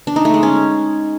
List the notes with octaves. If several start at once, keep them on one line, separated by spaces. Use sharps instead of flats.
D4
D#4
A3
G#3
C#4